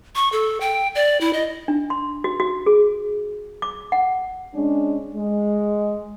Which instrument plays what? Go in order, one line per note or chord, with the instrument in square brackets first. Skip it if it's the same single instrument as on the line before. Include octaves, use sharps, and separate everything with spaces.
[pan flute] C#6
A4
G5
D5
E4
D#5
[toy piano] D4
C6
F#4
F#4
G#4
D6
F#5
[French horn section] G#3 C#4 D4
G#3